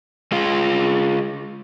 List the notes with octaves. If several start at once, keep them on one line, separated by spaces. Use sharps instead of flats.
G#3 F4